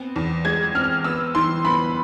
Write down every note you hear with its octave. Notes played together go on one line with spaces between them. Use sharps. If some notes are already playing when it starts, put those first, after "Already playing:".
Already playing: B3 C4
E2
G#3 G#6
C4 F6
B3 E6
E3 C6
B3 B5